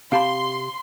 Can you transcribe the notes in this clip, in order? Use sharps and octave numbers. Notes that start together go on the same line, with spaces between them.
C3 G4 F5 A5 B5 C6